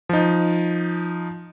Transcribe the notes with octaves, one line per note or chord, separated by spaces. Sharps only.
F3 D#4